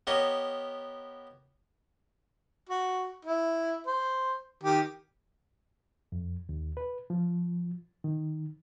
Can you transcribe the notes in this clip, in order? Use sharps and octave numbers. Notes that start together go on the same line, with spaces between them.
B3 G4 A#4 C#5 D#5
F#4
E4
C5
D#3 G4
F2
D#2
B4
F3
D#3